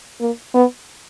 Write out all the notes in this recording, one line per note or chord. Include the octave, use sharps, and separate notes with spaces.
A#3
B3